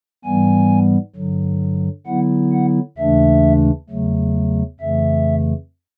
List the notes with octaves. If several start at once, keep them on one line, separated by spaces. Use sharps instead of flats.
G#2 E3 G3 B3 G#5
G2 D3 F#3
D3 F#3 B3 E4 F#5
F#5
D#2 C#3 E3 A3 D4 E5
E2 C#3 F#3 A3
F2 C#3 E3 A3 E5